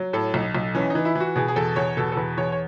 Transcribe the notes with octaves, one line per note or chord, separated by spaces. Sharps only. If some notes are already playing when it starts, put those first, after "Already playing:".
Already playing: F#3
A2 A4
B1
B1
E3 C#4
E3 D#4
E4
E3 F#4
B2 G#4
G#4
E2 A4
E2 C#5
B2 A4
A4
E2 B4
E2 C#5
C#5